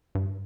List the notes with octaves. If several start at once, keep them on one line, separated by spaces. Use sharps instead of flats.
G2